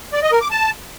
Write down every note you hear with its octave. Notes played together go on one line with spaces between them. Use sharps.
D5
D#5
A#4
D6
A5